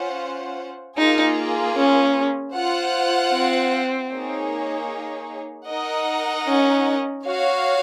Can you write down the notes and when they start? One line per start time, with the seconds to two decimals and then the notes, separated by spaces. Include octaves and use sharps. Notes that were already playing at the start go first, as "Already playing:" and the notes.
Already playing: C#4 F4 C5 F#5
0.97 A#3 D#4 F4 G#4
1.76 C#4
2.54 F4 C5 F#5
3.33 C4
4.12 A#3 D#4 G#4 C#5
5.69 D#4 A#4 D#5 F#5
6.48 C#4
7.26 F#4 C#5 F5